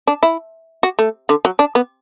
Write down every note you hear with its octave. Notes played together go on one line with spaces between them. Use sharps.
D4
E4
F#4
A3
D3
F#3
D4
B3